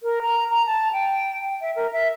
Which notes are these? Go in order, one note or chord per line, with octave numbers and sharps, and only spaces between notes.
A#4
A#5
A#5
A5
G5
E5
A#4
E5